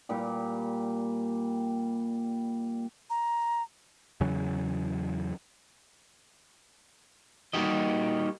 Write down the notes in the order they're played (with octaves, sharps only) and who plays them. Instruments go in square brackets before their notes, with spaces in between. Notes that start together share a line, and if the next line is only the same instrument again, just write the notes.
[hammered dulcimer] A#2 G3 G4
[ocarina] A#5
[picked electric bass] E2 C#3 F#3 C#4
[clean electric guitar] G3 A#3 D#4 F#4 G4 D#5